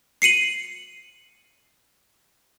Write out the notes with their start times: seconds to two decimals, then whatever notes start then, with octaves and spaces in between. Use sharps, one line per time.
0.22 C7 C#7 D#7 F#7